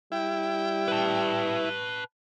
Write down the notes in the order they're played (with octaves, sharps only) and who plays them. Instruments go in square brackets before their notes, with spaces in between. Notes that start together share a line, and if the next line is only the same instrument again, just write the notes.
[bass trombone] G3 [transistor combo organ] E4 [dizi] G5
[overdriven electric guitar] B4 A5